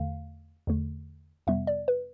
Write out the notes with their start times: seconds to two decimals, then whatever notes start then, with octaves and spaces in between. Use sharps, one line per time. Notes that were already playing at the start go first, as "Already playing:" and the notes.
Already playing: E2 D3 A3 F5
0.67 E2 D3 A3
1.47 F2 C3 G3 B3 E5
1.67 D5
1.88 B4